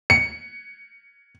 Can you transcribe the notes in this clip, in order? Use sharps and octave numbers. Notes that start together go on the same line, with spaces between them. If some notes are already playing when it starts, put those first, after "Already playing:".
C#7